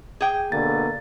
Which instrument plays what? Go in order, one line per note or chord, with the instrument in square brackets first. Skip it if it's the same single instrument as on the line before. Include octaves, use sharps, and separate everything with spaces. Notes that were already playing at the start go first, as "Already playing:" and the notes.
[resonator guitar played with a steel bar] G#4 G5
[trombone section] B2 D3 A#3 [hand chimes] A6